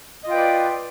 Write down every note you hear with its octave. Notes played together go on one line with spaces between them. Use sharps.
F4 B4 D5 D#5 G5